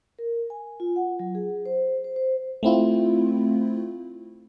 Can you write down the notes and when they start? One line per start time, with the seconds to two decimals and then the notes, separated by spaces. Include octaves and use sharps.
0.19 A#4
0.50 G#5
0.80 F4
0.96 F#5
1.19 F#3
1.35 G#4
1.66 C5
2.04 C5
2.16 C5
2.63 A3 C4 E4 F4